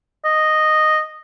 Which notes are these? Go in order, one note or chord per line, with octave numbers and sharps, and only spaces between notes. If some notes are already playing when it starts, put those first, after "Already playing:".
D#5